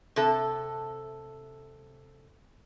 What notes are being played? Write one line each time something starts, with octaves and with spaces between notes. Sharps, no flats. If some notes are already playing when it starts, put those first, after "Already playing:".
C3 A4